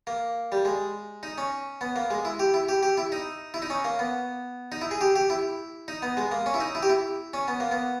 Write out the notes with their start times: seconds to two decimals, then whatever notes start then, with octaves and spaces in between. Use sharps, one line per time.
0.07 A#3
0.52 G3
0.65 G#3
1.23 D#4
1.38 C#4
1.81 B3
1.96 A#3
2.10 G#3
2.25 E4
2.39 G4
2.54 E4
2.69 G4
2.83 G4
2.98 E4
3.12 D#4
3.54 E4
3.62 D#4
3.70 C#4
3.84 A#3
3.99 B3
4.72 D#4
4.81 E4
4.91 G#4
5.01 G4
5.16 G4
5.30 E4
5.88 D#4
6.02 B3
6.17 G#3
6.32 A#3
6.46 C#4
6.54 E4
6.60 D#4
6.75 E4
6.83 G4
6.89 E4
7.34 C#4
7.48 B3
7.60 A#3
7.71 B3